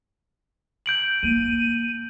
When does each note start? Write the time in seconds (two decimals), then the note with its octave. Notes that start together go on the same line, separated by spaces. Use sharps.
0.86 G6 D7 F#7
1.23 A#3 F4 D#7